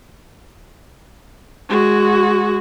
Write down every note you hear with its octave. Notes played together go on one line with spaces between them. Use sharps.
G#3 F#4